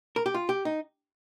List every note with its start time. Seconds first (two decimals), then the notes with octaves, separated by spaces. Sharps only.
0.16 A#4
0.26 G4
0.35 F4
0.49 G4
0.65 D#4